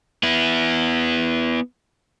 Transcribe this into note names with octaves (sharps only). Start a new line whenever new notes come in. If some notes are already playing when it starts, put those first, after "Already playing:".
B3 E4